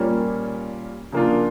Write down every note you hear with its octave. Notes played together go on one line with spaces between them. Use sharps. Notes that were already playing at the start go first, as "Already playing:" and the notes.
Already playing: A#2 G3 A#3 C#4
C#3 F3 A#3 D4 F4